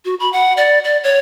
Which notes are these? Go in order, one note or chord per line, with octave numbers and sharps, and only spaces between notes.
F#4
B5
F#5
D5
D5
C#5